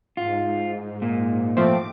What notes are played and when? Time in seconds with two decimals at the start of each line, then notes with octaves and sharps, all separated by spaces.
0.17 G#2 F4
1.02 A#2
1.57 F3 A3 C4 D6